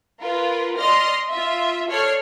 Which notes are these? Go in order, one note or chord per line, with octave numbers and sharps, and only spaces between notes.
F4 A#4 B4
D5 D#5 C6 F6 A#6
F4 E5
A4 C#5 D5 F6 C7